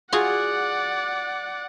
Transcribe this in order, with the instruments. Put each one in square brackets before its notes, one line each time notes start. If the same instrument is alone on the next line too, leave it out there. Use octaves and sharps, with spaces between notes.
[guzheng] F4 F#4 G#4 [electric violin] D5 F#5